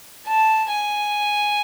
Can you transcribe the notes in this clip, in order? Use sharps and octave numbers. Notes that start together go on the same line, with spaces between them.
A5
G#5